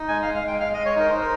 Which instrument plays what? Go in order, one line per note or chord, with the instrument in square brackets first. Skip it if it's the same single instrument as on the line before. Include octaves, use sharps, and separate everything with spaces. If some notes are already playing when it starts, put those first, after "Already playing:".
Already playing: [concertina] D#4
G#3 G#5
F5
G#3
F5
G#3 G5
G#3 F5
G#3 D#5
C#5
D#4 A#4
D#4 C5
A#4